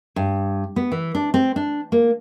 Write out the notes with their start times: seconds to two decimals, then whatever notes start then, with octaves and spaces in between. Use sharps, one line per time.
0.16 G2
0.76 B3
0.92 E3
1.15 D4
1.34 C4
1.56 D4
1.92 A#3